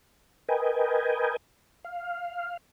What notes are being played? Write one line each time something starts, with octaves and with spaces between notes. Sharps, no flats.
A#4 B4 D#5 G5 G#5
F5